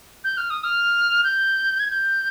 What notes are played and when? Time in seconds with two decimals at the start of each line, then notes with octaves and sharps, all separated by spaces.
0.24 G6
0.37 F6
0.50 D#6
0.64 F6
1.24 G6
1.80 G#6
1.90 G6